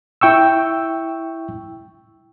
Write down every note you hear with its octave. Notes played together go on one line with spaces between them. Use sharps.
E4 G5 C#6 E6